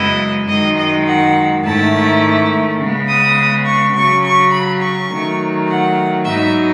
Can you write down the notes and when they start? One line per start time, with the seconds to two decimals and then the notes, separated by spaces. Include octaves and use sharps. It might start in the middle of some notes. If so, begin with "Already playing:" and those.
Already playing: F#2 C#3 G#3 B3 E4 D#5
0.48 F#2 D#3 G#3 D#5
0.78 D#5
1.07 F#5
1.64 G#2 D#3 A3 C#4 E4 A5
2.79 C#3 G#3 B3
3.08 D#6
3.66 C#6
3.95 C#3 F#3 C#4 C#6
4.24 C#6
4.52 B5
4.81 C#6
5.10 D#3 F#3 A3
5.68 F#5
6.25 G#2 F#3 B3 D#4 E5